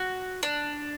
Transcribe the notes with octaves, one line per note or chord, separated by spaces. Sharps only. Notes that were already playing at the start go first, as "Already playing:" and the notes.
Already playing: F#4
D4